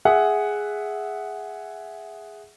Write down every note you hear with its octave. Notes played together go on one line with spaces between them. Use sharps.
G#4 E5 F#5